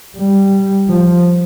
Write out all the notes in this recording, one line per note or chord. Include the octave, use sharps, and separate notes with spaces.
G3
F3